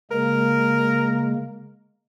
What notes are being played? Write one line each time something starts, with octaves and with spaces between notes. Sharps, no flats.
C#3 G#3 A#3 A#4